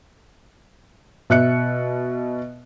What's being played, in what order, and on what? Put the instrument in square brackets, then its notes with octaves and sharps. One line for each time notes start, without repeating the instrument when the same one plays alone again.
[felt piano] B2 E5 F#6 C#7